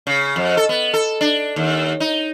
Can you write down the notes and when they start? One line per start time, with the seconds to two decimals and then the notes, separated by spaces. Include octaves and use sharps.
0.07 C#3
0.36 F2
0.57 A4
0.69 B3
0.94 A4
1.21 D4
1.56 D#2
2.00 D#4